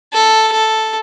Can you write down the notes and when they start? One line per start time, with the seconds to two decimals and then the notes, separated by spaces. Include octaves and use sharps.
0.13 A4
0.53 A4